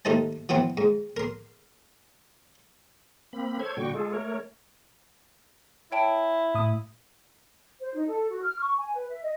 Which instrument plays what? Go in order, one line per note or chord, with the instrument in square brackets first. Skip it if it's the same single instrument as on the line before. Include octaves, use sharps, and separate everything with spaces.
[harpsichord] D#2 A3 D#4 C5 A5
E3 F3 B3 C4
G#2
A#4 C6
[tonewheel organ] A#3 C4 B5
A4 C5 C#5 G#6
A#2 D3 G3 F#4 G5 C#6
G#3 F4 G#4 A4
A3 A#4 C#5
[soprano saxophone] E4 [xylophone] C#5 G5 A5
[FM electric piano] A2 D#6
[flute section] C5
D#4
A4
F#4
F6
C#6
G#5
B4
E5
D#5